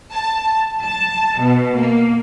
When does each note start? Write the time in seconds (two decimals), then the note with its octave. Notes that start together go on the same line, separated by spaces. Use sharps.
0.13 A5
0.83 A5
1.39 B2
1.76 A#3